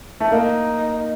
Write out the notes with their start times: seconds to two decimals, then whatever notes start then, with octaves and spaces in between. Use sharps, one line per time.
0.20 A3
0.32 A#3 D#4